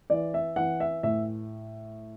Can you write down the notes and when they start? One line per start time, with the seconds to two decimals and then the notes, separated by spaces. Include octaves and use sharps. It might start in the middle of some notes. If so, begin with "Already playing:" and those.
0.10 E3 D5
0.34 E5
0.56 E3 F#5
0.80 E5
1.03 A2 E5